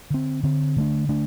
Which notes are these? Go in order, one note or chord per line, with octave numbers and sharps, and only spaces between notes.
D3 C4
D3 C4
D3 A3 D4
D3 A3 D4